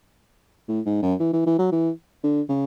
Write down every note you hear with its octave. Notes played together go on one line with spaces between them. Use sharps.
A2
G#2
F#2
E3
E3
E3
F#3
E3
D3
C#3